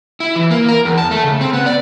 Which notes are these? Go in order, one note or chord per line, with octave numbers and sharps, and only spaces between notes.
E4
E3
A#3
A#4
E2
A5
A3
C#3
C4
B3
D5